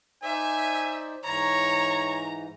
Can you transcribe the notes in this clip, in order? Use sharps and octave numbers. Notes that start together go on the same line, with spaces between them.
D#4 C5 D5 E5 G#5
G#2 E3 C#5 A#5